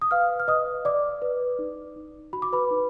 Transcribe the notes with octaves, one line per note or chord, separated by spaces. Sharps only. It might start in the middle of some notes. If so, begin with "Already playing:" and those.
D#6
B4 F5 F6
F6
B4 D#5 D#6
D5 D6
B4
D#4
D#4
F#4 B5
D6
B4 B5
D#4